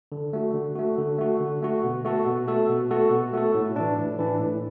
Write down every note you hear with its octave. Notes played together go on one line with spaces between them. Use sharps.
D3
A3 F#4
D3
A3 F#4
D3
A3 F#4
D3
A3 F#4
B2
A3 F#4 A4
B2
A3 F#4 A4
B2
A3 F#4 A4
B2
A3 F#4 A4
A2
E3 D4
A2
E3 D4
A2